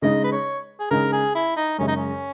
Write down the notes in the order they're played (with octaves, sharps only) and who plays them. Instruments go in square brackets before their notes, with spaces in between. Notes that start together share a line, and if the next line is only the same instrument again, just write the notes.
[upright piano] C#3 G#3 D#4 [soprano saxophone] D#5
[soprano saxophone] B4
C#5
G#4
[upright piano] C#3 G#3 D#4 [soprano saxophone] A#4
[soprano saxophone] G#4
E4
D#4
[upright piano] F#2 C#3 G#3 [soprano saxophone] C#4
[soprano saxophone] D#4
C#4